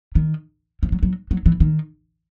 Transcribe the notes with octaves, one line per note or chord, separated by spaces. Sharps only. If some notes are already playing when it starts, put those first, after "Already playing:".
D#3
F3
F#3
F#3
F#3
E3
D#3